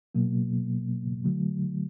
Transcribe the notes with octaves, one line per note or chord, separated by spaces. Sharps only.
B2 F#3 A#3
D3 F#3 A3